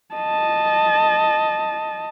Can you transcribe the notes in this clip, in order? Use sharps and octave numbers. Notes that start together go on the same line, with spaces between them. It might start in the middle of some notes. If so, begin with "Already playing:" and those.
D#5 A5